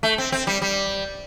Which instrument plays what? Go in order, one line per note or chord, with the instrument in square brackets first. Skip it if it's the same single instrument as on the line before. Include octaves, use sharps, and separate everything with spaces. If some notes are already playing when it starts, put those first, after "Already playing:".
[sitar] A3
C4
C4
G3
G3